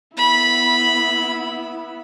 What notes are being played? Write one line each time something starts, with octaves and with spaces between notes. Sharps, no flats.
B3 E4 B5